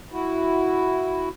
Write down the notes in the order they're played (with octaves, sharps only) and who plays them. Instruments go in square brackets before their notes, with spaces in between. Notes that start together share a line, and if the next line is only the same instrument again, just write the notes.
[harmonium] E4 F#4